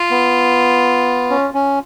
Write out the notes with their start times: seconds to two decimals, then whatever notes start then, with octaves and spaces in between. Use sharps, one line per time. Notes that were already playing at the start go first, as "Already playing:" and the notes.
Already playing: F4
0.11 B3
1.30 C#4
1.54 C#4